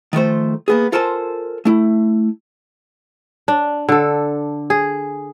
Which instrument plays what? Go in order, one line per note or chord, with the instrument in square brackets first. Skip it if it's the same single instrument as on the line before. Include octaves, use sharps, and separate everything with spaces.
[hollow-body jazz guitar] D#3 F3 A3 C5
A#3 B3 G#4
F4 A4 A#4 C5 G#5 A5
A3 E4
[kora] D4
D3 A4
G#4